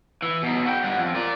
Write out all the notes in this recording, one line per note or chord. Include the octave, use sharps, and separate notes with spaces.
E3
B2 D#4
F#4 G5
G2 F#5
F2
A#4 D5